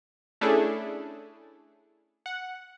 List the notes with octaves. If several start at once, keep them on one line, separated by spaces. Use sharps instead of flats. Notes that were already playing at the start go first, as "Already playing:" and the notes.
A3 C#4 D4 E4 G#4 A4
F#5